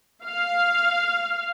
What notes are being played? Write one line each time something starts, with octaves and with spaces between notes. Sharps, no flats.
F5